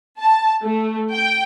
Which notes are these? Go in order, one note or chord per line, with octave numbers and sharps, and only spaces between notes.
A5
A3
G5